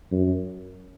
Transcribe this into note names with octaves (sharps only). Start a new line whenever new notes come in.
F#2